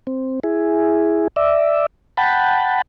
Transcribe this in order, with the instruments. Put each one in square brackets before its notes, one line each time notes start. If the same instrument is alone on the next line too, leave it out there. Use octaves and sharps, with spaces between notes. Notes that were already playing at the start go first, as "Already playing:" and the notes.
[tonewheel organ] C4
E4 G#4
D5 E5
F#5 G5 A5 B5